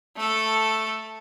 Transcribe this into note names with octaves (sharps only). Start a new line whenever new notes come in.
A3 A4